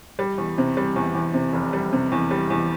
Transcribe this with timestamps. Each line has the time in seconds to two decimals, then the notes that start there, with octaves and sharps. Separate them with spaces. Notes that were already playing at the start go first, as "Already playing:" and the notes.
0.19 G3
0.38 E2
0.58 C3
0.77 G3
0.96 E2
1.15 E2
1.34 C3
1.53 F1
1.73 G3
1.93 C3
2.12 E2
2.31 G3
2.50 E2